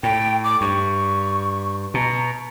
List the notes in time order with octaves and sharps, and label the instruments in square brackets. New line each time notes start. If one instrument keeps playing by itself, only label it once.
[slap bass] A2 [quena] G5
[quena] D6
[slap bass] G2 [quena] C#6
[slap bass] B2 [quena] A#5